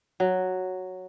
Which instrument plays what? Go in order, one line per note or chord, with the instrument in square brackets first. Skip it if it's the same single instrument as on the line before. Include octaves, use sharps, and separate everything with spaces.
[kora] F#3